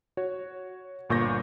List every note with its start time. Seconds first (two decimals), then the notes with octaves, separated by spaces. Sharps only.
0.17 F#4 C#5
1.09 G1 A#2 C#6 G6 A#6